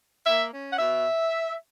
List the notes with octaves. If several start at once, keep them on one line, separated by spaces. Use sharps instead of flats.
A#3 E5
C#4
F#5
B2 E5